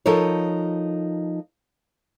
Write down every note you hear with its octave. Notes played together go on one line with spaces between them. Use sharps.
F3 D#4 A4 A#4 C#5